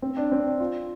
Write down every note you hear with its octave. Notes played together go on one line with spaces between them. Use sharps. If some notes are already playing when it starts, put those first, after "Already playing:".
C4
D4
C4
D4
F4